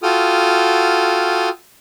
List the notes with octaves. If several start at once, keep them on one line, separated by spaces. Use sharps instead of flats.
F4 F#4 A4 G5 D#6 F6